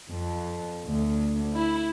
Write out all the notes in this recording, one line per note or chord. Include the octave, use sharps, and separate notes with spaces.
F2
D2
E4